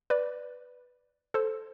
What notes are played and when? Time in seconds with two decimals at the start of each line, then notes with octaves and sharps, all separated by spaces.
0.10 B4 D5
1.34 A4 C5